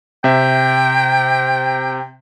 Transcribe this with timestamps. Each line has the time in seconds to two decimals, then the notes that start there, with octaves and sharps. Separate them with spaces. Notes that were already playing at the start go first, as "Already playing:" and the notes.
0.24 C3 E5 G5